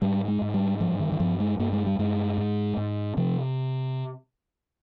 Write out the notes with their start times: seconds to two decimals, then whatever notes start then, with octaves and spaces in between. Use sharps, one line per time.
0.02 G#2 G3
0.28 G#3
0.42 G#2
0.54 G3
0.81 G2 F3
1.00 D#3
1.12 D#3
1.20 G2 F3
1.40 G#3
1.59 G2 A#3
1.73 G#3
1.87 G3
1.99 G2 G#3
2.38 G#2
2.77 G#2
3.17 C3 F3